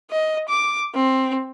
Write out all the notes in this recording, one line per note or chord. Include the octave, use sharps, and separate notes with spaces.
D#5
D6
C4